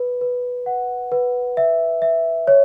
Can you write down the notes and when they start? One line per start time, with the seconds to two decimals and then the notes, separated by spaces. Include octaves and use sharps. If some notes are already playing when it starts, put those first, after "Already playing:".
Already playing: B4
0.21 B4
0.66 F#5
1.12 B4
1.57 E5
2.02 E5
2.47 C#5